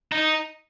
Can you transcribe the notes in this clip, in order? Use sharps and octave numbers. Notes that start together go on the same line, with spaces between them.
D#4